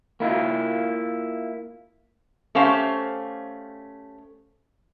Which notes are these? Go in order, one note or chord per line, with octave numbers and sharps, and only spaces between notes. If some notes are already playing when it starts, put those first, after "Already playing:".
A#3 E4 F4
A3 C#4 G4 C5 F5